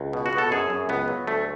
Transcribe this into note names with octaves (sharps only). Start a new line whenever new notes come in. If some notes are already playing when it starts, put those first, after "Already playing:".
Already playing: C#2
B2
F#4
B2
A4
F#2 G#4
F#2
C#2 B3
F#3
D2 A3